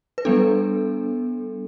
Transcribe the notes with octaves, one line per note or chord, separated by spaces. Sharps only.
B4
G3 B3 D4 A4